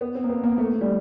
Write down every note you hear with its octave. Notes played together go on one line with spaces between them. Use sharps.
B3
C4
A#3
B3
A#3
A3
G3